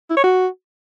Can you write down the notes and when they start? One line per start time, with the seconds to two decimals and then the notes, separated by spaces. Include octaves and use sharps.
0.10 E4
0.17 C#5
0.23 F#4